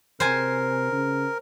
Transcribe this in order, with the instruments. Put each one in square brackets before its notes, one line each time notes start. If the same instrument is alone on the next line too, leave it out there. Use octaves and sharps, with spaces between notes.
[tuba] C3 [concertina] A#4 [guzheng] C5 G#5
[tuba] C#3